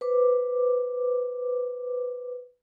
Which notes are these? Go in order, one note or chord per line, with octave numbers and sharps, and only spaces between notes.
B4 C5 D6